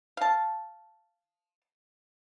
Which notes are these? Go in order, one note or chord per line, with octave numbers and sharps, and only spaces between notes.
F5 A5